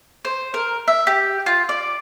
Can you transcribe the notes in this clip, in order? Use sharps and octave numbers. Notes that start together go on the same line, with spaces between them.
C5
A#4
E5
G4
F4
D5